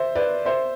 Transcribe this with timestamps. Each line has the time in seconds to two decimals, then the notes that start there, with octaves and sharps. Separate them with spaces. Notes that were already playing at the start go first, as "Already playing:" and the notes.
Already playing: C5 E5
0.15 B4 D5
0.45 C5 E5